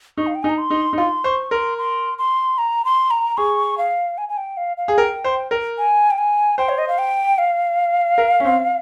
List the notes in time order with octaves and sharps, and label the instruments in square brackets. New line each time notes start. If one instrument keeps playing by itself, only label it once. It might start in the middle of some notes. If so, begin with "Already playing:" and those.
[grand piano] D#4 [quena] C#6
[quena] F5
G5
[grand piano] D#4 [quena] G#5
[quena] A#5
C6
[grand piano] D#4
D#4
[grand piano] F4 [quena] C6
[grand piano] C5 [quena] C#6
[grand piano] A#4 [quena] C6
[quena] C6
C6
A#5
C6
A#5
[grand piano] G#4 [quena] C#6
[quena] F5
G#5
G#5
G5
F5
F5
[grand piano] G#4
[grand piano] A#4 [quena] G5
[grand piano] C5
A#4
[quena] G#5
G5
G#5
[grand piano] C5 [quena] G5
[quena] C#5
D#5
F5
G5
F5
[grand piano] A#4
C#4
C4